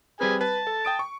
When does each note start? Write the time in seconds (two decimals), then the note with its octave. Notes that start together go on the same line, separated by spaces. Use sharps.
0.21 G3 C4 G#4 B4 G#5
0.41 B4 A5
0.67 A4
0.85 G5 D#6 D7
0.99 C#6